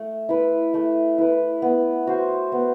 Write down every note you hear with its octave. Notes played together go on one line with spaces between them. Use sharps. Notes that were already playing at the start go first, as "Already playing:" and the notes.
Already playing: A3
E4 B4
A3
E4 B4
B3
F#4 C5
B3